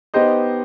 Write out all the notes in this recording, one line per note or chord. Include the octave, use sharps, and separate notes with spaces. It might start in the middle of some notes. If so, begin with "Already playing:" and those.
B3 D#4 G4 C5 D#5